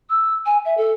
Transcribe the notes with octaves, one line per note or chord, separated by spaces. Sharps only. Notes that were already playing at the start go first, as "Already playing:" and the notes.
E6
G#5
E5
A4